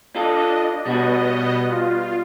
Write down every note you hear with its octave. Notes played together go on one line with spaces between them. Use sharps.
D4 F4 A4 D#5
B2 G3 B3 F#4 D#5
F4